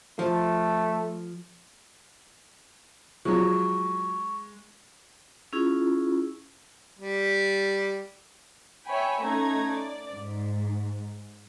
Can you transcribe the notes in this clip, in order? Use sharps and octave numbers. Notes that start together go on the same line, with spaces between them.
F3 A3
F3 F#3 G#3 C#6
C#4 E4 F4 G#4
G3
C#5 E5 G5 G#5 B5
A3 C#4 D#4 A#5 G#6
D5
G#2